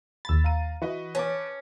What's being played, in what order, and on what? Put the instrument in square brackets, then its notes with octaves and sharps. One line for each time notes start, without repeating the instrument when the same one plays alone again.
[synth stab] D#2 A6 [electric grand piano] B5 E6
[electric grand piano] F5 A#5 D#7
[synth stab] E3 [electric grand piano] F#4 B4 D#5
[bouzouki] C#4 [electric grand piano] B4 A5 D6